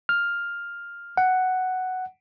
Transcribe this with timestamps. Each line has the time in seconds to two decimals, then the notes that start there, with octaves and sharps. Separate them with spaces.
0.09 F6
1.17 F#5